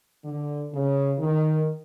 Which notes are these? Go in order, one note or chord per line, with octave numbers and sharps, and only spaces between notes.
D3
C#3
D#3